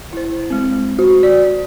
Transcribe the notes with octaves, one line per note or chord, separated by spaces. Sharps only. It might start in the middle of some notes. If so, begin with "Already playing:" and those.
E4 C5
G#3 C4
F#4
D5